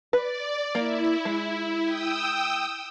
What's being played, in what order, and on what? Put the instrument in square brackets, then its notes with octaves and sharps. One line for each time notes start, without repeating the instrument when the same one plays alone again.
[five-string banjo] B4 [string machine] D5
[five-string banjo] A#3 [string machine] E4
[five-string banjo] G#3
[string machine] G5 D#6 E6